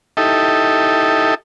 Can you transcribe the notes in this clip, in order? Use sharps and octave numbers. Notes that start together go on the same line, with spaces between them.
D#4 E4 G4 A4